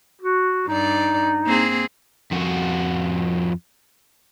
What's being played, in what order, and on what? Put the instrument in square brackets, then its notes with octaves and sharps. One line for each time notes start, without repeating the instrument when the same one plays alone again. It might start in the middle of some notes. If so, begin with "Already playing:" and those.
[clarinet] F#4
[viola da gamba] G2 D5 [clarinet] D#4
[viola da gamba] A#3 C4 G#4
[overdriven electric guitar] F2 F#4